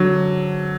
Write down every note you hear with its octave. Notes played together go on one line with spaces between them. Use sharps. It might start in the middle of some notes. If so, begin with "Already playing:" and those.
Already playing: D3 F#3